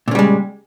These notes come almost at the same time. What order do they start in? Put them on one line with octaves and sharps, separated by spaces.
A#2 C#3 G3 G#3